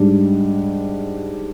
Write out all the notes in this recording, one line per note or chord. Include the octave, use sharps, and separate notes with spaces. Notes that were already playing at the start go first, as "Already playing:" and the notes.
Already playing: G#2 G3 D4